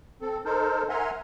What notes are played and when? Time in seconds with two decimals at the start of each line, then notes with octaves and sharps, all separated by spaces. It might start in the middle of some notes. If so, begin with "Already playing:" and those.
0.21 C4 A4
0.45 D#4 A4 A#4 C5
0.89 A#4 E5 F#5 G#5 A#5 C6